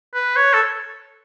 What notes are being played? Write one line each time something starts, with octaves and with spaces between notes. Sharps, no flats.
B4
C#5
A4